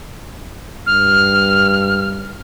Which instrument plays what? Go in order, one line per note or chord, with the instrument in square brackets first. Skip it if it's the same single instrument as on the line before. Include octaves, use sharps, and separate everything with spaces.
[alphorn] G2 [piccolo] F6